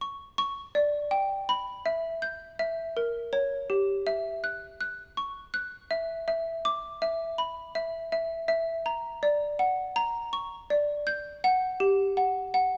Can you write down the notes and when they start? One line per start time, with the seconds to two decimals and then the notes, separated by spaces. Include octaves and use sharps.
0.01 C#6
0.38 C#6
0.75 D5
1.11 G5
1.49 B5
1.86 E5
2.22 G6
2.59 E5
2.97 A#4
3.33 C#5
3.70 G4
4.07 E5
4.44 F#6
4.81 F#6
5.17 C#6
5.54 F#6
5.91 E5
6.28 E5
6.65 D6
7.02 E5
7.38 B5
7.75 E5
8.12 E5
8.48 E5
8.86 A#5
9.23 D5
9.59 F#5
9.96 A#5
10.33 C#6
10.70 D5
11.07 G6
11.44 F#5
11.80 G4
12.17 F#5
12.54 F#5